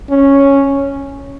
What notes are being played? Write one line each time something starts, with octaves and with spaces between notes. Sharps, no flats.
C#4